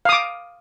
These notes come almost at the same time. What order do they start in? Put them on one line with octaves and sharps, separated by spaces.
F5 D#6 D6